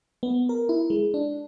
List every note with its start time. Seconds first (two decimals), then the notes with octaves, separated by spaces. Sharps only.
0.23 B3
0.49 A#4
0.69 E4
0.90 G#3
1.14 D4